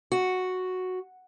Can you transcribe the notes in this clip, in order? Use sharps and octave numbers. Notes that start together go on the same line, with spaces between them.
F#4